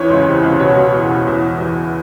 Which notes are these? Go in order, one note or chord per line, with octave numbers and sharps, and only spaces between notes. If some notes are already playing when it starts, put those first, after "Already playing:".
Already playing: E2 E3 C#5
C#2
C3
C#2
B2 C#5
B2
E2
B2
E2
E3
E2